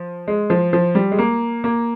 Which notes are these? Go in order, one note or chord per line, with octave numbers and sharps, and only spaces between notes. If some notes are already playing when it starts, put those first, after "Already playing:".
Already playing: F3
G#3
F3
F3
G3
G#3
A#3
A#3